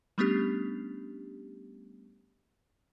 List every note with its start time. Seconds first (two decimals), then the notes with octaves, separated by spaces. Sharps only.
0.18 G3 A3 B3 C#4 D4 G4